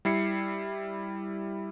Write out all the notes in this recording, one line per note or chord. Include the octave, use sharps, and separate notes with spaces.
G3 E4 C7 C#7